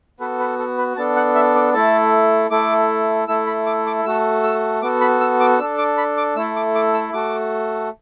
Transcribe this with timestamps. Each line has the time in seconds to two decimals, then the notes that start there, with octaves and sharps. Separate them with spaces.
0.20 B3 F#4 A4 B4
0.39 B4
0.59 A4
0.78 B4
0.97 B3 D4 A4 A5
1.16 F#5
1.35 E5
1.55 D5
1.74 A3 E4 A4 A5
2.50 A3 E4 A4 D6
3.28 A3 E4 A4 E6
3.47 B5
3.66 D6
3.86 D6
4.05 A3 F#4 A4 E6
4.43 E6
4.82 B3 F#4 A4 D6
5.01 B5
5.21 E6
5.40 D6
5.59 D4 E6
5.63 A4
5.78 D6
5.98 B5
6.17 D6
6.36 A3 E4 A4 E6
6.56 D6
6.75 D6
6.94 E6
7.13 A3 F#4 A4 D6